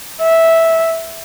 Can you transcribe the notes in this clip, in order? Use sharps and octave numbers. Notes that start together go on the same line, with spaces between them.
E5